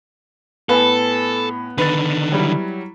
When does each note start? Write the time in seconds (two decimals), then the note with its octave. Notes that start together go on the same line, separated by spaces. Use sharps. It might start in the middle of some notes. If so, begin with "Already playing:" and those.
0.69 A2 B3 A4 G#5
1.78 D3 D#3 B4 A6
2.32 F#3 G3 E4